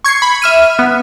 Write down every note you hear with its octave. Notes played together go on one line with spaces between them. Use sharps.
C#6 G#6 C7 C#7
B5
E5 F6 D#7
B3